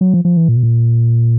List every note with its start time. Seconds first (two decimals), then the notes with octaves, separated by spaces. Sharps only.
0.01 F#3
0.14 F3
0.25 F3
0.37 E3
0.49 A#2
0.56 B2
0.63 A#2